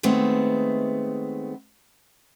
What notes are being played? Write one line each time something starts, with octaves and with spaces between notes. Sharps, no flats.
D#3 G#3 A3 B3 C4